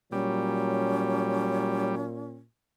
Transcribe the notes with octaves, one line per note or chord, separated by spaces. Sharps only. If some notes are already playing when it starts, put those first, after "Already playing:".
A#2 F#3 G3 C#4